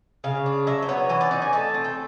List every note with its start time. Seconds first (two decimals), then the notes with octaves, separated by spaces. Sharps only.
0.24 C#3 F5
0.46 D4
0.67 F#3 E5
0.82 C5
0.89 B3 C#5
1.09 E3 C5
1.21 D5
1.31 D#4 D5
1.42 G#5
1.53 A3 A5
1.74 C4
1.84 G5